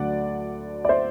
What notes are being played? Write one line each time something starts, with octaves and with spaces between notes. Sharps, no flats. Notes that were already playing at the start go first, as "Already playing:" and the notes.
Already playing: D2 D3 F#3 D5 F#5
D5
C5 E5